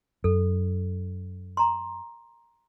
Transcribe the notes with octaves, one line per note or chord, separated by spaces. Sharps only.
F#2 A4
A#5 C6